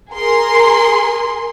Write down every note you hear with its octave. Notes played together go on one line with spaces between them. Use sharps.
G#4 A#4 C6